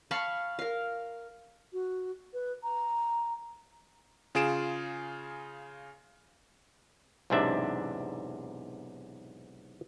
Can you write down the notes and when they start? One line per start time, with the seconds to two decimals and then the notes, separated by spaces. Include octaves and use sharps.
0.11 F5 A5 B5 C#6
0.59 A#4 F5
1.73 F#4
2.33 B4
2.63 A#5
4.35 C#3 F4 G#4 D7 E7
7.30 B1 E2 G#2 C3 D4 E5